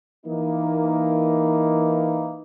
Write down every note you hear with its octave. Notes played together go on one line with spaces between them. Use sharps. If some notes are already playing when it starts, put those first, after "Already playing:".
E3 A#3 D#4